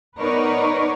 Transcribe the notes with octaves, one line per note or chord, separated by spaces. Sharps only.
B3 D#4 A#4 B4 C#5 D5